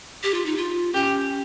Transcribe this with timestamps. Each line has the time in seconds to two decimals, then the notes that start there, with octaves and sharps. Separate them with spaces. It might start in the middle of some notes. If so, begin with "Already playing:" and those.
0.23 G4
0.34 F4
0.45 D#4
0.57 F4
0.94 C#4 G4